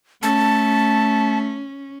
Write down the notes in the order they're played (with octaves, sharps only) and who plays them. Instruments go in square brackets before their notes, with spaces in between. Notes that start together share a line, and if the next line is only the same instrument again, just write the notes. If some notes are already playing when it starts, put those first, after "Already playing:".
[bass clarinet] A3 [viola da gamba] C#4 [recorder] A5